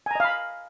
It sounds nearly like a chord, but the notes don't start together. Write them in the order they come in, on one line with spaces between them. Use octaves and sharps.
G#5 A#5 D#5 F5 B5